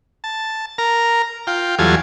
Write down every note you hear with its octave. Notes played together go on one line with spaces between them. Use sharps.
A5
A#4 A#5
F4 G5
E2 F#3 G3 F4 A4 G#5